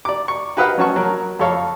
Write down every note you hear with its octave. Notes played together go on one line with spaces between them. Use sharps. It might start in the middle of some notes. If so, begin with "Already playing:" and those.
D5 D6
C#6
F#4 G4 B4 D#5 F5 F#5
F#3 C#4 F#4 A5 C#6
F#3 A#4
F2 A4 C#5 F5